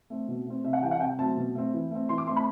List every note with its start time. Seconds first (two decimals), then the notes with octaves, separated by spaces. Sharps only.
0.10 A3 C4
0.28 B2
0.46 A3 C4
0.64 C3 E5
0.73 F#5
0.82 E3 G3 G5
0.91 F#5
1.00 C3 G5
1.19 F#3 A3 C4 A5
1.37 B2
1.55 A3 C4
1.73 E3
1.91 A3 C4
2.09 E3 C6
2.18 D6
2.27 A3 C4 C6
2.36 B5